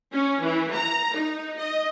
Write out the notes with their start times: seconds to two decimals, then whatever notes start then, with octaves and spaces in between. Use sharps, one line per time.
0.13 C#4
0.41 E3
0.73 A#5
1.13 D#4
1.57 D#5